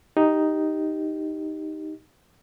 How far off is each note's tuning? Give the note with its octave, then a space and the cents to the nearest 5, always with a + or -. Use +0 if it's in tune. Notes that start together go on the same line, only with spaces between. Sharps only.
D#4 +0 G4 +0